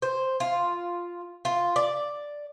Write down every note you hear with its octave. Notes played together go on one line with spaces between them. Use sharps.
C5
F4
F4
D5